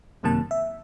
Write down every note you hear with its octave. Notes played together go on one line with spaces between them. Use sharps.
G1 F#2 C3 D#3 A#3 A5
E5